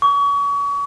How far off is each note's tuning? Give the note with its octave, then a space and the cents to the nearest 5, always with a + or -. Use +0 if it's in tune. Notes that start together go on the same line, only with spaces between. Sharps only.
C#6 +35